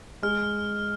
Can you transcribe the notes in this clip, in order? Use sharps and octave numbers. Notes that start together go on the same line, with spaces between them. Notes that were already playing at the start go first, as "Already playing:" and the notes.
G#3 F6